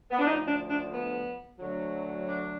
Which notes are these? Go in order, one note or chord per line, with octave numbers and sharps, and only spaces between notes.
B3
D4
D2 D3 F3 D#4
D4
D4
B3
D2 D3 F#3
D4